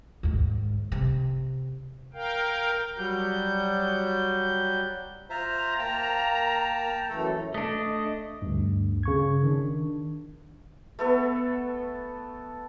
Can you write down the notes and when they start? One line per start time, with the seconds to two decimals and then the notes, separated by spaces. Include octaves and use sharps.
0.23 D#2 G#2
0.92 C3
2.14 A#4 F5 G5
2.97 F#3 G3 G6
5.30 F4 C5 E5 A#5
5.79 A#3 F5 G5 A5
7.09 F#2 E3 A3 A4
7.54 A3 D4 D#5
8.42 D2 G2
9.03 C#3 C#6 G#6
9.43 D#3 D4
10.99 A3 B3 A4